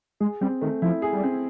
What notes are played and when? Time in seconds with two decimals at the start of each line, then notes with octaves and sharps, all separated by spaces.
0.20 G#3 G#4
0.41 G3 C4
0.61 D#3 A3
0.82 F3 E4
1.02 G#4
1.13 G3
1.23 C4